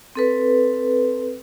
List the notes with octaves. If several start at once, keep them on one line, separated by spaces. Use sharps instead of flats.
C4 A4 B4